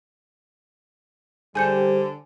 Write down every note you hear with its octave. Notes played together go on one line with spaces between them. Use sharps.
D3 G3 G#4 C5 G#5 G6 C#7